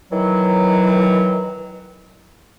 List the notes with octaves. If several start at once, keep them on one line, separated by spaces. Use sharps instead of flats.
D#3 E3 F#3